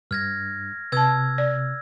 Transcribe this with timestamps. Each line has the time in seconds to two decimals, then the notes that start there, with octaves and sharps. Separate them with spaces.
0.11 G2 F6 G#6 A#6
0.92 C3 B4 A5 E6 G#6
1.38 D5